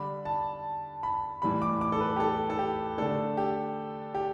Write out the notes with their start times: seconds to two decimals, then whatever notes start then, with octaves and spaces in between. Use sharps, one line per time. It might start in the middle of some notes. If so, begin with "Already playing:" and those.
Already playing: D3 G3 D4 B5
0.25 A5
1.03 B5
1.42 A2 E3 G3 B5
1.62 D6
1.81 D6
1.92 A4
2.01 B4
2.16 G4
2.20 A4
2.50 A4
2.59 G4
2.98 D3 A3 D4 A4
3.37 G4
4.14 G4